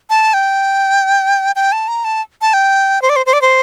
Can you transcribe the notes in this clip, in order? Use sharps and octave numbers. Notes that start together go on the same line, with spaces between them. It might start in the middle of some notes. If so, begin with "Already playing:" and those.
A5
G5
G5
A5
A#5
A5
A5
G5
C5
D5
C5
C5
D5
C5